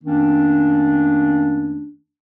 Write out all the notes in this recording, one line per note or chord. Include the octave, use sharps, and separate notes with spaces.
F2 D#3 A3 A#3 C#4 D4